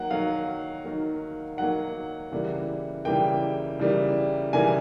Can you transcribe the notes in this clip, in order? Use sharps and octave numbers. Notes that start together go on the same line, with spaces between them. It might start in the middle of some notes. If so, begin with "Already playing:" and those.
Already playing: D#3 F#3 A#3 F#5
D#3 F#3 A#3 F5
D#3 F#3 A#3
D#3 F#3 A#3 F#5
C#3 E3 G3 A#3
C#3 E3 G3 A#3 G5
C#3 E3 G3 A#3
C#3 E3 G3 A#3 G#5